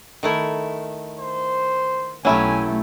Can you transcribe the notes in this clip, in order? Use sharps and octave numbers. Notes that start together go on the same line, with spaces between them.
D#3 A3 E4
C5
B1 F#3 A3 C#4 E4 G4 G#5